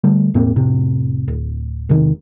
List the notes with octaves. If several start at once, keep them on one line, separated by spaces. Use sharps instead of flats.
D3 G3 A3
E1 A2 A#3 C4
F1 A2 C3
D1
E1 C3 D#3